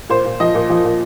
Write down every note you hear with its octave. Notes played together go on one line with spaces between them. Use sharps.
A#2 C5
A#2
F3 D#5
A#2
F3
A#2